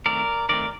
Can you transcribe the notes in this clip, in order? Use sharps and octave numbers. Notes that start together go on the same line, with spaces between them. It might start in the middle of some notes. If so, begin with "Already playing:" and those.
D#3 A3 C4 A#4 D5
D#3 A3 C4 A#4 D5